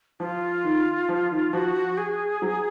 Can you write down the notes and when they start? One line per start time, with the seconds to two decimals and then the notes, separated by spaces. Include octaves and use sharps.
0.20 F3 F4
0.64 D#3
1.09 F3
1.31 D#3
1.53 F3 F#4
1.98 G#4
2.42 F#3